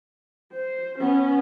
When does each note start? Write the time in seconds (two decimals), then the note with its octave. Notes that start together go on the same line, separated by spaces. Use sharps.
0.53 C5
0.99 B3 C#4